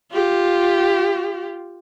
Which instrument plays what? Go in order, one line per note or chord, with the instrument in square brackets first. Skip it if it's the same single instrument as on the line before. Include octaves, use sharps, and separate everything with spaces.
[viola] F4 G4